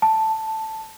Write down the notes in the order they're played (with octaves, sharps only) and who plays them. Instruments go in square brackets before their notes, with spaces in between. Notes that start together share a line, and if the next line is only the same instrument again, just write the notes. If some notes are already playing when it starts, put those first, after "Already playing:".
[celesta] A5